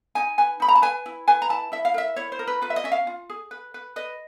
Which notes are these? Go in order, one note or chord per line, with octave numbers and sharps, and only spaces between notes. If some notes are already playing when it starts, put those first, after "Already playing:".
D#4 G#5
B4 G#5
D#4 B5
A#5
A5
B4 G#5
E4
B4 G#5
A#5
E4 A5
E4 E5
F5
A#4 E5
E4 C#5
C5
A#4
B4
F4 B4
E5
D#5
C#4 E5
F5
F4
G#4
B4
B4
B4 D#5